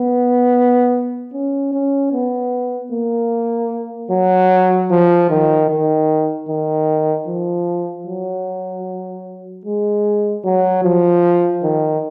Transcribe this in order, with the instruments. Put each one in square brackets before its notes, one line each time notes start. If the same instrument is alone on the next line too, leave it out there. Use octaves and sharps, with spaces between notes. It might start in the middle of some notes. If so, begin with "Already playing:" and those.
Already playing: [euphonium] B3
C#4
C#4
B3
A#3
F#3
F3
D#3
D#3
D#3
F3
F#3
G#3
F#3
F3
D#3